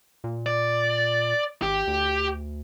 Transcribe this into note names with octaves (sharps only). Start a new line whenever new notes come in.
A#2
D5
G#1 G4
D2